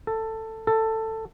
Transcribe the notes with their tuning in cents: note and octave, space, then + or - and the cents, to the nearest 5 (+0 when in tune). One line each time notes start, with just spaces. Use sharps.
A4 +15
A4 +15